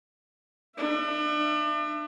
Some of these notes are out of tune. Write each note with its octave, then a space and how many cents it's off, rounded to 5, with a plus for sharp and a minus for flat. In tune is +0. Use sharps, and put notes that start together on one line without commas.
D4 +35 E5 +35